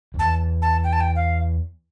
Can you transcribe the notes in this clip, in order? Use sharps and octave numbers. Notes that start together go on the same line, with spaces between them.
F2
E2 A5
A5
G5
A5
G5
F5